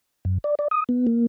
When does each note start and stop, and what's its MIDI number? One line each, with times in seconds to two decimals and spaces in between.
0.25 0.38 42
0.44 0.55 74
0.59 0.68 74
0.71 0.84 87
0.89 1.06 59
1.07 1.26 58